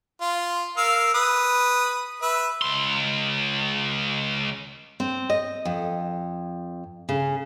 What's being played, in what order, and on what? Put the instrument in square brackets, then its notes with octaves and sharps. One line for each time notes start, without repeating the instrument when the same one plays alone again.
[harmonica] F4
A#4 F5 E6
B4 D#6
B4 E5
[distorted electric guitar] C#2 C6
[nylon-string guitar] C4
D#5
F2
C#3